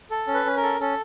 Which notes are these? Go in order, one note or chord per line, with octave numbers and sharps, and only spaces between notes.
A4
C#4
B4
C#4
A#4
A4
C#4 A4